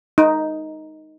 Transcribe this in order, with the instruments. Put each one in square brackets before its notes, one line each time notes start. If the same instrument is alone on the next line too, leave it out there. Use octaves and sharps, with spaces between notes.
[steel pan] D#4